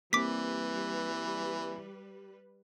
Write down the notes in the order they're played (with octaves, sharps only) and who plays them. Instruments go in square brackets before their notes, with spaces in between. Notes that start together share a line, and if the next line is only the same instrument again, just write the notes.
[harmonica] E3 [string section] G3 B4 [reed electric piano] A#3 C4 [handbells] D6 B6